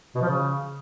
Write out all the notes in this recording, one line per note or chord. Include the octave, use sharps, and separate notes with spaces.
B2
F3
C#3